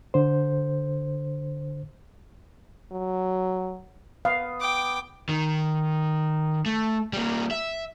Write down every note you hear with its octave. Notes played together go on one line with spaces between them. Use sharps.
D3 C5
F#3
B3 F5
G5 D6
D#3
A3
G3 A#3
E5